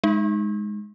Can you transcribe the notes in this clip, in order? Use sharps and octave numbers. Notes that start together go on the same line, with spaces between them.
G#3 D#4